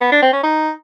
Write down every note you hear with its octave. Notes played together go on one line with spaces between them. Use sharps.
B3
D4
C4
C#4
D#4